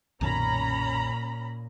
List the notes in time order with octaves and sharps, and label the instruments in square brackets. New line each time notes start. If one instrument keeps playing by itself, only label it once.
[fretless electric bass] B1 F#2 D#3 [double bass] A#2 [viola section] C#4 A#5 B5